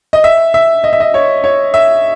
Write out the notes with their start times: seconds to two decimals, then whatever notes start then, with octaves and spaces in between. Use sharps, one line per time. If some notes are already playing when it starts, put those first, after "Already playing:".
0.13 D#5
0.24 E5
0.54 E5
0.84 D#5
0.93 E5
1.00 D#5
1.14 C#5
1.44 C#5
1.74 E5